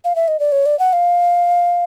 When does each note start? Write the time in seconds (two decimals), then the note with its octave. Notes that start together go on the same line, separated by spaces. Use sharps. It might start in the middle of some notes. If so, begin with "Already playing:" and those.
0.04 F5
0.16 E5
0.28 D#5
0.40 D5
0.52 C#5
0.66 D5
0.79 F#5
0.93 F5